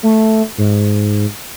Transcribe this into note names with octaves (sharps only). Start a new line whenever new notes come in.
A3
G#2